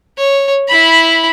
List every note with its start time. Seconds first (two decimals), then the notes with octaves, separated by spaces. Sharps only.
0.17 C#5
0.68 E4 B5